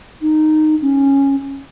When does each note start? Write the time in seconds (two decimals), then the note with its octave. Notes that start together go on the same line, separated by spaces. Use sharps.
0.22 D#4
0.82 C#4